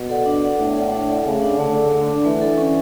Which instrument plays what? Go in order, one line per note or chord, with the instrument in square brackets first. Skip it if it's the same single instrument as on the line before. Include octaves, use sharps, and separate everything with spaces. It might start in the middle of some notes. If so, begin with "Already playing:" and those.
Already playing: [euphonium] B2
[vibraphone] A4 D5 F#5
D4
A4 D5 F#5
[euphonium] A2 [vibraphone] D4
[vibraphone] A4 D5 F#5
D4
A4 D5 F#5
[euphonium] C#3 [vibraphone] A3
[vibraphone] D4 A4 D5
[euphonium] D3 [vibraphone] A3
[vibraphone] D4 A4 D5
A3
D4 A4 D5
[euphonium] E3 [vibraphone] A3
[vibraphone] D4 A4 D5
C#4